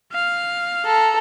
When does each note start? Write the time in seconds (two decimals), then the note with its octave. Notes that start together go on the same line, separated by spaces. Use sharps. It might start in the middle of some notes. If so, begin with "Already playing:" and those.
0.12 F5 F6
0.85 A4 A#5